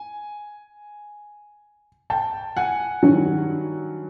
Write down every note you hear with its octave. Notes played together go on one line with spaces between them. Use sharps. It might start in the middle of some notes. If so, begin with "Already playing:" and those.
Already playing: G#5
G5 A5
F#5 G#5
G2 D#3 F#3